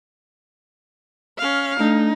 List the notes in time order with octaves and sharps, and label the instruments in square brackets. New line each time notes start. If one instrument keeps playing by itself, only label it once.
[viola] C#4 F5
[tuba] A3 [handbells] D4 [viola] D#4